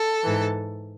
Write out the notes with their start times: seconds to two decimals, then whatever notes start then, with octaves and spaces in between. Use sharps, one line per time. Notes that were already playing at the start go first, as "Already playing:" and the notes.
Already playing: A4
0.24 G#2 E3